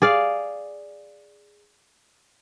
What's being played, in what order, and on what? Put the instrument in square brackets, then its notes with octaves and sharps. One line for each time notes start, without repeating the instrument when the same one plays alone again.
[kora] G#4 D5 F5